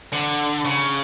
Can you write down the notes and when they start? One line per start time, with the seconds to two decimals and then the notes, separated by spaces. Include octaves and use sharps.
0.13 D3
0.65 C#3